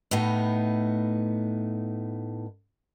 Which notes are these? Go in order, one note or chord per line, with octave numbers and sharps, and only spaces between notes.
A2 B3 D#4